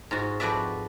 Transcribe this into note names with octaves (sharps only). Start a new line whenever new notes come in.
G#2 F4 F#4
F2 F#4 B4 D5 E5